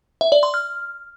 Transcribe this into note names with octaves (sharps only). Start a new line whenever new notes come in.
E5
D5
C6
F6